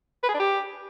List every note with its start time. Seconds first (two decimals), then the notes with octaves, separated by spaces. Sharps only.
0.23 B4
0.29 G#4
0.34 D4
0.40 G4